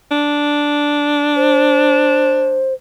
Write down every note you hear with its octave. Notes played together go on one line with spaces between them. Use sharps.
D4
C5